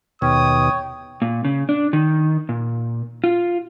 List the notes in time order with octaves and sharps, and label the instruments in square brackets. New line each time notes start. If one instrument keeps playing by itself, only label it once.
[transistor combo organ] D#2 B2 [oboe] C#5 [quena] G5 [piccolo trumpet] D#6
[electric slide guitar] A#2
C#3
D4
D#3
A#2
F4